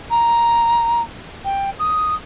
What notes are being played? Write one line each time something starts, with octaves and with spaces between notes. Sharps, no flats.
A#5
G5
D#6